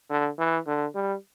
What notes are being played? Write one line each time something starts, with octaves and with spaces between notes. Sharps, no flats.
D3
E3
D3
G3